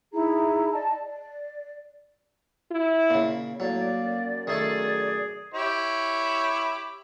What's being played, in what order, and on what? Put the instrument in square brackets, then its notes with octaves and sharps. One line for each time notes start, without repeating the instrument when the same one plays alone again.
[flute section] D#4 E4 G#4 A#5
D5 D#5 A5
D5
[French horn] E4
[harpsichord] A#2 C#3
[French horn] A2 [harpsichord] F#3 [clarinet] A#3 [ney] D5
[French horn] F#2
[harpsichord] D#3 A3 A4 [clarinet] G#4 [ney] D5
[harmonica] E4 G4 C#5